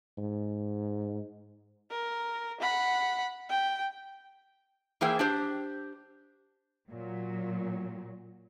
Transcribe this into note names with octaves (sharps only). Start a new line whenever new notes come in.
G#2
A#4
F#5 B5
G5
E3 A#3 G#4 C5 E5 G5
D4 G4 C5
A#2 F#3